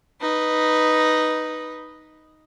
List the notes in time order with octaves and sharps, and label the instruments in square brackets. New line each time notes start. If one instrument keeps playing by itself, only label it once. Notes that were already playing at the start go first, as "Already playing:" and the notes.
[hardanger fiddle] D#4 B4